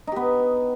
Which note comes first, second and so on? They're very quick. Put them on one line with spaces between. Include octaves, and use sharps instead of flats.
D#4 G4 B3